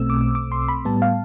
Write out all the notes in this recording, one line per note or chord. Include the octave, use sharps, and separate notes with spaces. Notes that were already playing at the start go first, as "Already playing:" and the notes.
Already playing: B1 B2 A3 C4 E6
D6
D6
C6
B5
A2 G3 B3 A5
F5